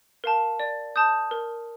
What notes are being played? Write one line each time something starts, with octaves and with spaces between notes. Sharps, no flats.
A#4 F5 A5
D5
A5 D#6 G6
A#4